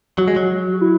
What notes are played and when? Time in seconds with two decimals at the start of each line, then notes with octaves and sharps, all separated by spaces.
0.18 F#3 F#4
0.28 G#3
0.36 F#3
0.73 F#4
0.81 E4